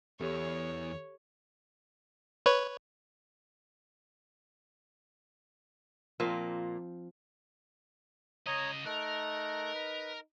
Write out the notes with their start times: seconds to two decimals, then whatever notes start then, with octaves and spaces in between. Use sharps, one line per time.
0.20 E2 G4 A4 C#5
2.46 B4 C#5
6.20 A#2 F3 A#3 C4
8.47 C#3 C#5 D#5 A#5 D#6
8.86 A3 D#4 A#4 F#6
9.74 B4